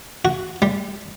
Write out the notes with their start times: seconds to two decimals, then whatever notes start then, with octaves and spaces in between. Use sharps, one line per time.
0.25 F#4
0.62 G3